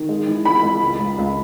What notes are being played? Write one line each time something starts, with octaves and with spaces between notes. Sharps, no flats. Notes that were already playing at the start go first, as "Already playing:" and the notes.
Already playing: D#3
G#3
E3
G#3 B5
G#3
C#2
C#2
C#2